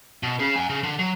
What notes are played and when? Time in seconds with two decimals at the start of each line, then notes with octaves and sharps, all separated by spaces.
0.23 B2
0.40 C#4 G#4
0.56 F#5 G#5
0.69 C#3
0.83 D3
0.99 F#3